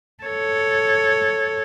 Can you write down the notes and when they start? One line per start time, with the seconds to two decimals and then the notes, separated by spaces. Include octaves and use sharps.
0.24 A4 C#5